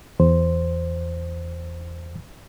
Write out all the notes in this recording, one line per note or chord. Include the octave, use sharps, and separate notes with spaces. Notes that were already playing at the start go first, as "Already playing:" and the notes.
E2 C5